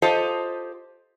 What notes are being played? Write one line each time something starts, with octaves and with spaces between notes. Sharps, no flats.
F4 G4 A4 C5 D#5